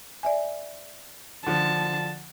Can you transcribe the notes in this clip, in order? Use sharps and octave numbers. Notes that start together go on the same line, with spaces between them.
D5 E5 G#5
D3 F3 A5